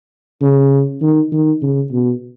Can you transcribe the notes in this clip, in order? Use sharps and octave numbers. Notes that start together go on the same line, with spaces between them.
C#3
D#3
D#3
C#3
B2